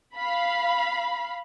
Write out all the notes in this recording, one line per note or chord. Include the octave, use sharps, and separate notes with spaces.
F5 B5